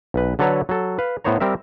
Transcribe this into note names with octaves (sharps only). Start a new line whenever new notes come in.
B1 B4
D3 F#3 A4 B4 C#5 A#5
F#3 A4
B4 F5
A2 B3 C5 C#5 A#5
G3 C4 A#4 E5